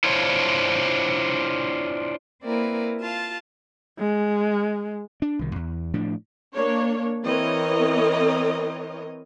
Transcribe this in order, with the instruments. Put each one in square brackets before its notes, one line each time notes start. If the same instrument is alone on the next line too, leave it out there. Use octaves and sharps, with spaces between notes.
[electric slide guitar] D4 E4 F4 C5 C#5
[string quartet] A#3 C4 E4 A#4 B4 D5
F4 F5 A5
[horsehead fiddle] G#3
[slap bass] D4
C2 D#3
E2
A2 F3 D4
[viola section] A#3 D4 C#5
E3 C4 A#4 C#5 D#5